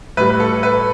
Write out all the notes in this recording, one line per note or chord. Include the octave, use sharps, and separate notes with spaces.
A2 G3 B4
B4
A4
B4